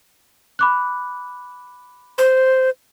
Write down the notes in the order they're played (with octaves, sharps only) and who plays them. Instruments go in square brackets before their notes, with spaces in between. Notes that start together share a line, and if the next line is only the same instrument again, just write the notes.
[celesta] B5 D6 F#6
[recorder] C5